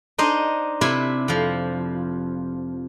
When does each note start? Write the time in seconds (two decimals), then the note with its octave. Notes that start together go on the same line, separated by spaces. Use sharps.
0.18 D4 D#4 C5 D#5
0.81 C3 E4 B4 E5 C6
1.28 F2 F3